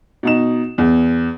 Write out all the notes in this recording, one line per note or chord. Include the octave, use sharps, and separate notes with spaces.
B2 D#4 E7
E2